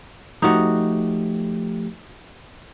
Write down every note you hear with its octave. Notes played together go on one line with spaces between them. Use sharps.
F3 A3 D#4 F#4 G4